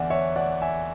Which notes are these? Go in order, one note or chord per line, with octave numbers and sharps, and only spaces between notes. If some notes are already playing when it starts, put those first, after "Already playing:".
Already playing: E2 D3 D5 E5 F#5 G#5
C#5 E5
D5 F#5
E5 G#5